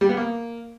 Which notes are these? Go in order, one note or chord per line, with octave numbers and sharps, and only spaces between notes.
G3
B3
A#3